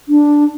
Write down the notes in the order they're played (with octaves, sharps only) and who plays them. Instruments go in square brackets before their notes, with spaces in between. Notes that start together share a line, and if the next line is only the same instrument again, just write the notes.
[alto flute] D4